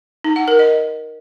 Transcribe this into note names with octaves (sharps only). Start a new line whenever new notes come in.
D#4
F#5
A#4
D#5